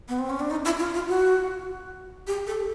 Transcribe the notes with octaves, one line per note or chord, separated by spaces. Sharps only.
B3
C4
C#4
D4
D#4
E4
F4
F4
F#4
G4
A4